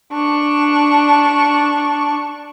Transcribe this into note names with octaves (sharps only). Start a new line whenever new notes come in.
D4 C#6